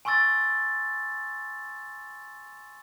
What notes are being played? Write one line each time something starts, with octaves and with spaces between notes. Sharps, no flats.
G#5 C6 C#6 E6 A6